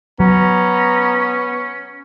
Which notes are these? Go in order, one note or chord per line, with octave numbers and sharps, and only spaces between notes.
F#3 B3 C#4 A#5